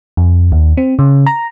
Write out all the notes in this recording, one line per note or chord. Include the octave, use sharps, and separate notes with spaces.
F2
D#2
C4
C#3
A#5